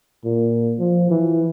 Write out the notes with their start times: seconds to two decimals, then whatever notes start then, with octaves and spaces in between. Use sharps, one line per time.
0.24 A#2
0.79 F3
1.10 E3